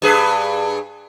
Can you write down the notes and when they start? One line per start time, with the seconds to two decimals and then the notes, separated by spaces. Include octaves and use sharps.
0.02 G2 G#4 B4